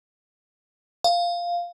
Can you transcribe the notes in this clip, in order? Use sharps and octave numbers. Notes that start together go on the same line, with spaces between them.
F5